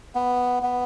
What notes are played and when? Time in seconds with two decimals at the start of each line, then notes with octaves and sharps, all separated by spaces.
0.15 B3
0.63 B3